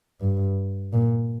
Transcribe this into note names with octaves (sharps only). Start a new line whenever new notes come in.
G2
A#2